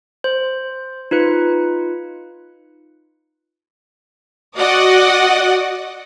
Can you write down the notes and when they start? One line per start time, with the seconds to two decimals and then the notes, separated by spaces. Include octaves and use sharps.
0.24 C5
1.11 D#4 F4 B4 C#7
4.55 F#4 D5 D#5 F#5